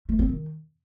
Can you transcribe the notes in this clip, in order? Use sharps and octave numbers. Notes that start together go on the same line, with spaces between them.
A3
C4
D#3